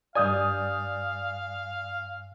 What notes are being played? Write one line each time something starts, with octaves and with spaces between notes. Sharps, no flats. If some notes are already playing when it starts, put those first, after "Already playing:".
G2 D5 F5 G#5 D#6 G6